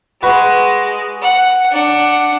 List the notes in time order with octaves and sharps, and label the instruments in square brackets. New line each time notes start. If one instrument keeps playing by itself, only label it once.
[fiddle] G#3 [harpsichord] F#4 B4
[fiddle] F#5
D4 F#5